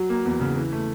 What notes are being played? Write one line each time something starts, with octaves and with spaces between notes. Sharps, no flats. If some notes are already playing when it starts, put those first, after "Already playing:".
Already playing: F#3
A#3
E2
C#3
E3
A3